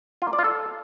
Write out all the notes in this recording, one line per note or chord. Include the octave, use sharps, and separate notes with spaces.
F4
A#3
D5
F4
A4